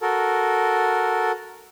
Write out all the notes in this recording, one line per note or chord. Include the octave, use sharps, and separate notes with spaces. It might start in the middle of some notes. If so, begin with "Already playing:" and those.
F#4 A4 A#4